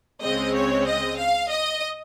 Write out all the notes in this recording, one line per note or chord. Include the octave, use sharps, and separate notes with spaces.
C#2 C#3 G#3 C4 D#5
C#5
D#5
F5
D#5